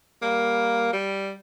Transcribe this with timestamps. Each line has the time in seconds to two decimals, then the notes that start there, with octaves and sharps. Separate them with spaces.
0.22 G3 A#3
0.92 G3